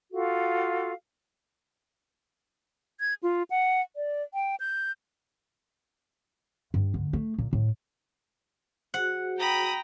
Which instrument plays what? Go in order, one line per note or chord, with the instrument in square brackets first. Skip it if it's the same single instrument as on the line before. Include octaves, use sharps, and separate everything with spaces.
[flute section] F4 F#4 A4 F5
[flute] G#6
F4
F#5
D5
G5
G6
[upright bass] G2
D2
A3
A#2
A2
[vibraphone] F#4 G#4 C5 [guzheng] F#5
[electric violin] G5 A#5 [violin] B5 D#6